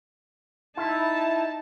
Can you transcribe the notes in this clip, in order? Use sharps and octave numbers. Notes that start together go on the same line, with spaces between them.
D#4 E4 A5